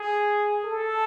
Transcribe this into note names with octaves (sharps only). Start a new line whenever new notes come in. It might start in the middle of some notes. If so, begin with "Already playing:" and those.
Already playing: G#4
A4